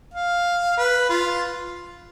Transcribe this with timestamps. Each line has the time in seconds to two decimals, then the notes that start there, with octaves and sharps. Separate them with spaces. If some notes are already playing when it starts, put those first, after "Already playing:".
0.14 F5
0.78 B4
1.10 F4